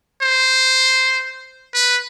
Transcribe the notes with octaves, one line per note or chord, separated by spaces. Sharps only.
C5
B4